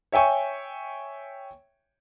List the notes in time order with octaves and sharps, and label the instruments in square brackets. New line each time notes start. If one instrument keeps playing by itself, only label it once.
[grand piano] C#5 E5 G5 G#5 C#6